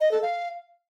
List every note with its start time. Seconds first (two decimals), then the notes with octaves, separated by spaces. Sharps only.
0.01 D#5
0.11 A4
0.22 F5